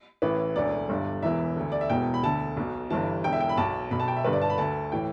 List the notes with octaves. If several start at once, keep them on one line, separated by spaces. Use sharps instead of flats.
A1 A2 E3 B4
E1 D2 D3 D5
G1 G2 D3
E1 E2 E3 E5
D2 D3
D5
E5
E1 E2 B2 G5
B5
D2 D3 A5
B1 B2
G1 G2 E3 A5
E1 E2 D3 G5
E5
G5
B5
B1 B2 A5
B1 B2 B5
A5
G5
E5
G1 G2 D3 B4
D5
A5
B5
D2 D3 A5
A2 E3 G5